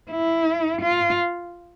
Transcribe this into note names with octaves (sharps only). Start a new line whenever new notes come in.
E4
F4